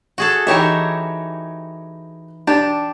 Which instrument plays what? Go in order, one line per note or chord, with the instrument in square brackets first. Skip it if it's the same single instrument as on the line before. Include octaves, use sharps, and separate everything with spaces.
[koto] F#4 G#4 A4
[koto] E3 D#4 E5 [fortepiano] G4 C#5 G5
[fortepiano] D4 A5 [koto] G4